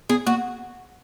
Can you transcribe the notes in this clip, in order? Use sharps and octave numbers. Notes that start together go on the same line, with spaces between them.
B3 G#4
A#3 F#4